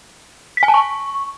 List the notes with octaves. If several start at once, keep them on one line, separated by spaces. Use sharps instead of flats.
B6
G#5
A5
C#6